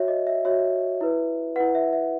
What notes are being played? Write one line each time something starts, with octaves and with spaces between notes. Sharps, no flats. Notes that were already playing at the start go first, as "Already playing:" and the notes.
Already playing: F#4 C#5 E5
D#5
E5
F#4 C#5 E5
E4 B4
E4 B4 F#5
E5
E5